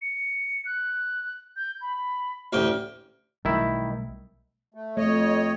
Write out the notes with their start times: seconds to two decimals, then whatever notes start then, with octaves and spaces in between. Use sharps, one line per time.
0.02 C#7
0.65 F#6
1.56 G6
1.81 B5
2.53 A1 D2 G5 F6
3.45 B1 B2 D#3 G3 A3 E4
4.74 A3
4.97 F2 A3 C#5 D#5